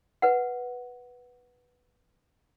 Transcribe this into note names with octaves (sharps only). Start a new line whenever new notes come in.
B4 F#5